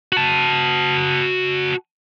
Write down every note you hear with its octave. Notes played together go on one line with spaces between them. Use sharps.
F#4 A5